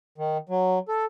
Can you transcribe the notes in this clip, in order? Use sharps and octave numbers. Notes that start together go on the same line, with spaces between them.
D#3
F#3
A4